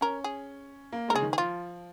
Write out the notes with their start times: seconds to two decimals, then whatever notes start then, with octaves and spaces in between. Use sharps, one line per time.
0.01 C#4 A#4
0.24 G#4
0.93 A#3
1.08 G#3 A#4
1.15 C#3 G#4
1.22 D#3
1.33 G#4
1.38 F3 F4